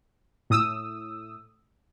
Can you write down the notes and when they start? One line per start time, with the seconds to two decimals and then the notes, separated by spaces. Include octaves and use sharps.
0.50 A2 D#6 E6